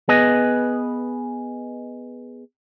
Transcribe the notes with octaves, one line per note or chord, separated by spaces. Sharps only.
B3 G#4 B4 D#5